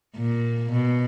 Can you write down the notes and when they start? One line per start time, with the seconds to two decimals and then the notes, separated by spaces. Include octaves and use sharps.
0.17 A#2
0.72 B2